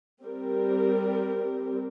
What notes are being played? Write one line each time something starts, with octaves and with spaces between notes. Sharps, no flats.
G3 C4 G4 A#4